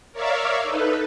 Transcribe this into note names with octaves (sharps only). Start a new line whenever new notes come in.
A#4 C#5 D5 E5 F5
D#4 A4 B4